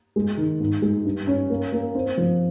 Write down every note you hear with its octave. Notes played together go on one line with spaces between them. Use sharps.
G#3
D#3
G#2
G#3
G2
C#4
A#3
A#3
C4
F3